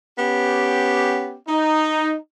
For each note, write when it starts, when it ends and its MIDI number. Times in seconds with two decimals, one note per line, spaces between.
0.18 1.38 59
0.18 1.38 61
0.18 1.38 67
1.48 2.16 63